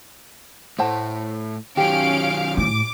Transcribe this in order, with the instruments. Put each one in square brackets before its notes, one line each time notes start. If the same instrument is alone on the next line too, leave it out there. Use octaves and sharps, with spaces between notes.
[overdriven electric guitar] A2 A3 [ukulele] C5 F#5 A5
[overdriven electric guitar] D#3 F#3 [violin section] C#4 F5 D7 [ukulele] G4
[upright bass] A2 [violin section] D6